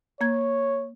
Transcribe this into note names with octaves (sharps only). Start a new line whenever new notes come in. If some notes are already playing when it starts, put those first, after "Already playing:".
A#3 C#5 G#6